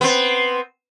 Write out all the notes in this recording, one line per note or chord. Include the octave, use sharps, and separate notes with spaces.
B3 C4